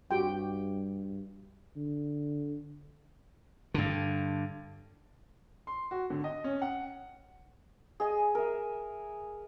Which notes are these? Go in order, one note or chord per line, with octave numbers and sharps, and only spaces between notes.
G2 F#4 G4 G5
D3
G2 D3
C6
F#4
D3
D#5
C#4
F#5
G#4 D#5 G#5
A#4 E5